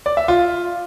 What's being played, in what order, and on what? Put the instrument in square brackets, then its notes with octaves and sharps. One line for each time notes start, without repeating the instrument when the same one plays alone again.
[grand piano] D5
E5
F4